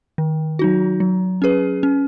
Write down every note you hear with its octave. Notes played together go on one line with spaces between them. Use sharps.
D#3
F#3 D#4 F#4
F#3
C#4 G#4 B4
C#4